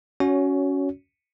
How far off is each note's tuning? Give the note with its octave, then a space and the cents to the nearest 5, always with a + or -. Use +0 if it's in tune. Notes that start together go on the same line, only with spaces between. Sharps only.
C#4 +10 F#4 +0 C#5 +25